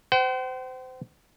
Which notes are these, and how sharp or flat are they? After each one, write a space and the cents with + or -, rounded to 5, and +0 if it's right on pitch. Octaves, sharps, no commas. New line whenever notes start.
C5 -25 G5 -45